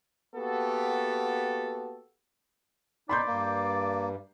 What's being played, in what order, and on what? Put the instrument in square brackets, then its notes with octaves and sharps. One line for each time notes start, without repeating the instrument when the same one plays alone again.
[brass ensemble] A#3 B3 F#4 G4 A4
[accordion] D#4 [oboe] D5 [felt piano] B5 C6 G6
[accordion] G2 [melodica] A#3